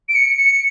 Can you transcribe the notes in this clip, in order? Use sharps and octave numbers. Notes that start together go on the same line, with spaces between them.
D7
C#7
C#7